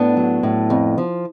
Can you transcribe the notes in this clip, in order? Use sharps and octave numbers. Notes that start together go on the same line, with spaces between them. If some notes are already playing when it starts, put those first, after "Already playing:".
Already playing: A2 B3 D4
F#3
A2
F2
F3